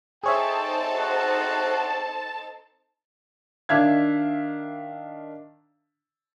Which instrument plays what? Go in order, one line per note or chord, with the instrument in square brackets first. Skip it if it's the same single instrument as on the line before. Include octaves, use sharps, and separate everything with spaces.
[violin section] C4 D#4 A4 [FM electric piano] G#4 C#5 E5 [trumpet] G5 [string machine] A5
[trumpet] F#4
[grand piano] D#3 D4 E5 F5 G#6